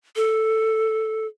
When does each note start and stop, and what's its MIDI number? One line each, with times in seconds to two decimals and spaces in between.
0.16 1.26 69